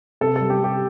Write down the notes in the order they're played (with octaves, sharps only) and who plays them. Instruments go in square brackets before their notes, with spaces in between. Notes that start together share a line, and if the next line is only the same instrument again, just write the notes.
[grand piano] C3 A4
G3 A4
G4
C3
G4